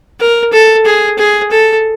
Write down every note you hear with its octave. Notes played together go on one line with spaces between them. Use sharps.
A#4
A4
G#4
G#4
A4